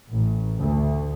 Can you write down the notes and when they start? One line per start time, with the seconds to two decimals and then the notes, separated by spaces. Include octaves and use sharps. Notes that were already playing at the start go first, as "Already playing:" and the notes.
0.12 A1
0.57 D2